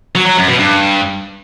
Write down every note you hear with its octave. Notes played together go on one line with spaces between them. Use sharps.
F#3
F#3
F#2
B2
G2